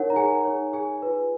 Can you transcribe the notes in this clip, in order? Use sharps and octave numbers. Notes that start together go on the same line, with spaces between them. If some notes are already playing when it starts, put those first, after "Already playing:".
Already playing: D#4 A#4 C#5 F#5
A#5
G#4 G#5
D#4 G#4 C#5
G#4 G#5
F4 B4